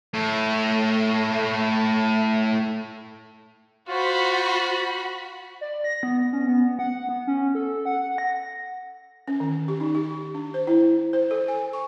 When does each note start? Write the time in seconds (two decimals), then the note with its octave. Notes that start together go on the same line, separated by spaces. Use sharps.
0.14 A2 A3
3.87 F4 F#4 C5 B5
5.61 D5
5.84 A#6
6.03 B3
6.33 C#4
6.48 B3
6.79 F#5
7.09 B3
7.27 C#4
7.55 A4
7.85 F#5
8.18 A#6
9.28 C#4
9.40 D#3
9.68 G4
9.80 D#4
9.95 G4
10.35 D4
10.54 C5
10.67 E4
11.13 C5
11.31 A4
11.48 G#5
11.73 C#6